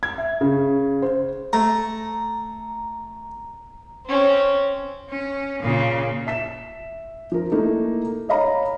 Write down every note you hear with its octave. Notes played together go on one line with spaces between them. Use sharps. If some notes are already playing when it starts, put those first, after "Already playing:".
G#6
E5
C#3
C5
A3 A#5
C4 C#4
C#4
A#2 C#3
E5 B6 E7
F3 A#4
A3 A#3 D#4 E4 A4
C#5 D#5 F5 A#5 B5